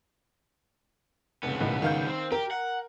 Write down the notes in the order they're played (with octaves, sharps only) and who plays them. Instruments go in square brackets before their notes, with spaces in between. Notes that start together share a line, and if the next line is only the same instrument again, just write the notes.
[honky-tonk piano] F1 [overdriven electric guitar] C#2 B3
[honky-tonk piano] B1 A2 D#3
D#3 F5 G6
[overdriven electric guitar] C4
[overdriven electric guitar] G4 [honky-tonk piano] A#4
[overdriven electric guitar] F#5